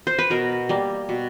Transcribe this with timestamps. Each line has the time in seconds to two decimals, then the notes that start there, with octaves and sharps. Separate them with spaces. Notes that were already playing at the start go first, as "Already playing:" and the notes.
0.07 C5
0.19 B4
0.30 B2 A#4
0.69 G3 A#3
1.09 B2